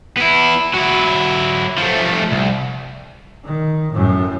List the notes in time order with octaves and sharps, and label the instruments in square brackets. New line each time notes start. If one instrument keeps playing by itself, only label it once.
[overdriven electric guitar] B3 E4
F#3 E4
F3 A3
C2
[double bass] D#3
F#2 A2